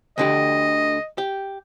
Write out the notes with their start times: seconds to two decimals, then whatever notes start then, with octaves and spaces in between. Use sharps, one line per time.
0.18 D2 D3 G4 D#5
1.18 G4